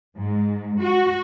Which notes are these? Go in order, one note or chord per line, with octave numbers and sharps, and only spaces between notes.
G#2
F#4